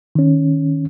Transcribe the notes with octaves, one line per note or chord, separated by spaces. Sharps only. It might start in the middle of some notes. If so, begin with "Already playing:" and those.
D#3 C#4